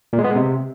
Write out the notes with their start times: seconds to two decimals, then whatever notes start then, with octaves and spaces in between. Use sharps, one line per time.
0.13 A#2
0.19 G#3
0.24 B3
0.30 G#3
0.36 C3